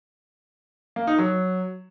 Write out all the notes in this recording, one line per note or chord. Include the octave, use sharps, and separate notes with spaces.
A#3
D#4
F#3